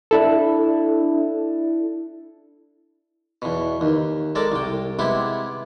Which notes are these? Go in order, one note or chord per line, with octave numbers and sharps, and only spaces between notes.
D4 E4 A4
E2 B2
D#2
G#3 A4 A#4 D5
C2 G5
C3 G#3 B3 E4 G4